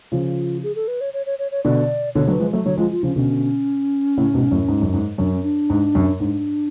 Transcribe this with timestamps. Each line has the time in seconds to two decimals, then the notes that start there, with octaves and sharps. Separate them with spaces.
0.12 C#3 F3 F4
0.63 G#4
0.75 A4
0.88 B4
1.01 C#5
1.13 C#5
1.26 C#5
1.39 C#5
1.51 C#5
1.64 B2 D3 D5
2.15 B2 D3 C#5
2.27 D3 F#3
2.32 B4
2.40 F3 G#3
2.53 F#3 A3
2.66 D3 F#3 C#5
2.78 F3 G#3 F4
2.91 F4
3.03 C#3 F3 C#4
3.16 B2 D3 C#4
4.17 A2 C#3
4.34 G#2 B2
4.51 F#2 A2
4.68 G#2
4.82 F#2
4.94 G#2
5.18 F#2 D4
5.32 C#4
5.43 D4
5.70 G#2
5.95 F#2
6.20 G#2 D4